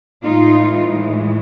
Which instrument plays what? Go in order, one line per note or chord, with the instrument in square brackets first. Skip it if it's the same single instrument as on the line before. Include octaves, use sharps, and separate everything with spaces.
[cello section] A2 E3 G#3 D#4 F4